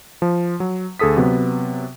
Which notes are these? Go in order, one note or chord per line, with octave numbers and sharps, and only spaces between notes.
F3
F#3
D2 G#4 A4 D#6 B6
C3 F#3 B3